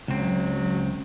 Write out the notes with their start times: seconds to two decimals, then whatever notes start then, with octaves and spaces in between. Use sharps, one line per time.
0.08 C#2 F#3 C4